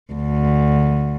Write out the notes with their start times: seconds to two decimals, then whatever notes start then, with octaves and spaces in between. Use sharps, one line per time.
0.13 D2